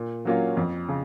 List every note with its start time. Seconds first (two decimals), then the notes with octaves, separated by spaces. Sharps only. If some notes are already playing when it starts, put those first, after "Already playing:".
Already playing: A#2
0.25 F#3 A#3 C#4 F4
0.57 F2
0.89 C#3